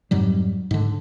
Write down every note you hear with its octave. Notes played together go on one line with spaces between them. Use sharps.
F2 G#2 F#3 G3
G#2 D3